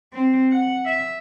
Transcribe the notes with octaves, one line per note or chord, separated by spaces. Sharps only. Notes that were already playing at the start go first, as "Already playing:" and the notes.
C4
F#5
E5